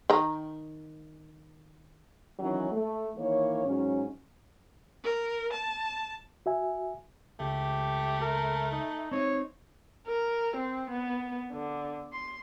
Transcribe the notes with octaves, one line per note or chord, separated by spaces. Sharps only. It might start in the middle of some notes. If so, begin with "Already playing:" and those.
D#3 A#5
D#3 E3 F#3 C#4 D#4
A3
D#3 E3 A#3 C#5
G#2 F#3 C#4
A#4
A5
F#4 E5 G#5
C#2 A3 G4
A#4
D#4
C4 D#4 C#5
A#4
C4
B3
D3
C6